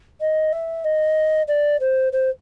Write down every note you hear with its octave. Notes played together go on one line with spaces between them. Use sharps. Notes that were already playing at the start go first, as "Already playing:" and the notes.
D#5
E5
D#5
D5
C5
C5